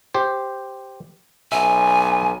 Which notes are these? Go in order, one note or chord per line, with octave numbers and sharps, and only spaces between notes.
G4 C5
B1 E5 G#5